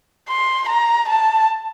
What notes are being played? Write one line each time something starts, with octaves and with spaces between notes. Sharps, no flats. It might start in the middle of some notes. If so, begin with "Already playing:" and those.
C6
A#5
A5